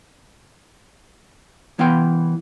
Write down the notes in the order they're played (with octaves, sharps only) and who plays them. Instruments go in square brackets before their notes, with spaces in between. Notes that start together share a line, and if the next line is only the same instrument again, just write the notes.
[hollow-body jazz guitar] C2 E3 B3 F5 G5 C6